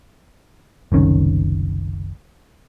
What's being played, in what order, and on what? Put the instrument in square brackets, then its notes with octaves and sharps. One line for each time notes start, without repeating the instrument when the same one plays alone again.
[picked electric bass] F#1 C2 D#3 C#4